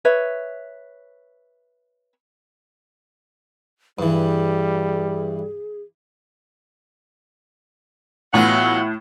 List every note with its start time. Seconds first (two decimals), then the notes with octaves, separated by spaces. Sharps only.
0.05 B4 C#5 E5
3.99 G2 E3 G3 G#4
8.34 A2 E3 F#3 B3 F4 C#5 F#5